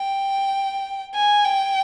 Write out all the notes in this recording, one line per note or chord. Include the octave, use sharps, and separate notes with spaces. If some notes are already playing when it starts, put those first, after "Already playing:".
Already playing: G5
G#5
G5